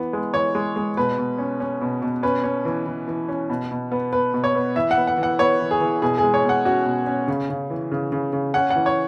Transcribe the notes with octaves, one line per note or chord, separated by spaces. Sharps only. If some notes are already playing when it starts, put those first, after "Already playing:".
Already playing: E3 B3
G#3
E3 C#5
G#3
G#3
B2 B4
B2
C#4
C#4
B2
B2
C#4 B4
C#4
E3
E3
E3
C#4
B2
B2
B3
B3 B4
B2
C#5
B3
E3 E5
F#5
B3
F#5
E3
F#5
B3 C#5
E3
G#4
E3
B2 G#4
G#4
G#3
C#5
B2 F#5
C#4 F#4
B2
C#4
C#3
C#3
E3
C#3
C#3
C#3
C#4 F#5
E3 F#5
C#5